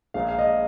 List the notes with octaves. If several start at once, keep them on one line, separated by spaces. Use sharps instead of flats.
A#1 A#2 F3 G#3 F5
F5
D#5